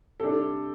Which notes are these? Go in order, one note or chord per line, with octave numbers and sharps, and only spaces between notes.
C3 G3 D4 A4